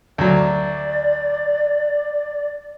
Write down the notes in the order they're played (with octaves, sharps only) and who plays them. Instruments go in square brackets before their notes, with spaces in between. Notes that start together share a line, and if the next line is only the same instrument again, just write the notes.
[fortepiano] D2 F#3 [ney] D5